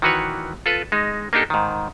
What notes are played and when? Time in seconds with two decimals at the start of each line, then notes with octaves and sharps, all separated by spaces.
0.02 D#3 E3 F#4 B4 C#5
0.66 F4 A4 B4
0.92 G#3 D#4
1.33 A#3 D4 D#4 G4 A4
1.50 G#2 D#3